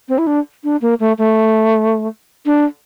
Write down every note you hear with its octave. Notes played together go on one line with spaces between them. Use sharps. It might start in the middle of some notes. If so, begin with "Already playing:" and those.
C4
E4
D4
D4
A#3
A3
A3
D4